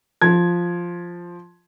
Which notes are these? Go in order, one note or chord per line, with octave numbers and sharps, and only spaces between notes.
F3 G#6